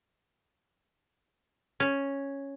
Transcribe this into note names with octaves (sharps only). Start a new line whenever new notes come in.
C#4